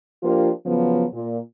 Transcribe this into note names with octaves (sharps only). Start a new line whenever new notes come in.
F3 A#3 D4 F4 G4
C#3 F3 F#3 B3
A#2